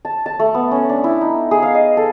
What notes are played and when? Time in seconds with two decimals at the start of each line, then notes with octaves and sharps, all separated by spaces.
0.05 A5
0.26 A5
0.39 A3
0.54 B3
0.71 C#4
0.89 D4
1.04 E4
1.21 D#4
1.51 G#4
1.62 F5
1.75 D#5
1.97 A4